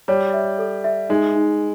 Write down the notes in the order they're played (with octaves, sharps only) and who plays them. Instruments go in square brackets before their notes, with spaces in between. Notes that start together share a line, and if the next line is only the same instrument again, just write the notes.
[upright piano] G3 [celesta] C#5
[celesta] E5
A4
E5
[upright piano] G#3 [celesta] D#4
[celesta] D#4